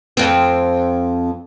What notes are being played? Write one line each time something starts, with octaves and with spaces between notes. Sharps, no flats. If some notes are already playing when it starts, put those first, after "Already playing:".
F2 C4